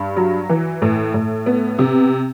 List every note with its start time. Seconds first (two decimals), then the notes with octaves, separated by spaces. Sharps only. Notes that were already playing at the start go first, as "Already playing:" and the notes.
Already playing: G2
0.17 F#3
0.49 E3
0.82 A2
1.14 A2
1.46 B3
1.79 C3